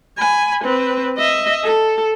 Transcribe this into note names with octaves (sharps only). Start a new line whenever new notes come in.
G#5 B5
C4 B4
D#5 E5
A4